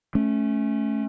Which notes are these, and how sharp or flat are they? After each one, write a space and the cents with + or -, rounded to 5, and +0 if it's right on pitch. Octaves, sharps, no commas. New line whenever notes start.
A3 -20 C#4 -5